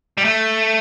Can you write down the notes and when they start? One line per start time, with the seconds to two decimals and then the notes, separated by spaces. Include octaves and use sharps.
0.18 G3
0.25 A3